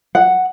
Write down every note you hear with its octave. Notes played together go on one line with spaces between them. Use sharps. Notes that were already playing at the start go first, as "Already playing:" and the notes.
F#5